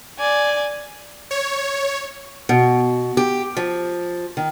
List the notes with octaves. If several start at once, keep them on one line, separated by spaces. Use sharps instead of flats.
D5 G#5
C#5
B2
G4
F3
D#3